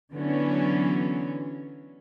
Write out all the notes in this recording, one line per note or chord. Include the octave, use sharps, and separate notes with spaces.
D3 E3 F#3 B3 C#4